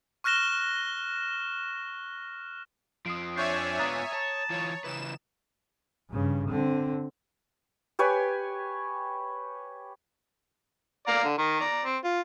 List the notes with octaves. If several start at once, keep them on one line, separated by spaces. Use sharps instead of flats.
C#6 F6 F#6 A#6 E7 G7
F2 F3 D#6 C7 D7
D4 C#5 E5 G#5 C#6 G6 C7
G#2 B3 F4 A#5 D#6 A6
C#5 A5
E3 F4 C#5
C#3 E3 B4 E7
G2 C#3
D3 C4
G4 B4 C#5 G#5
D5 F5 A#5
D3
D#3 A#4
D5 A#5
C4
F4